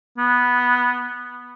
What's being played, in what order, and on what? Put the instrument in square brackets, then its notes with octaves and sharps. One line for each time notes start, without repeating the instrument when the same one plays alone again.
[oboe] B3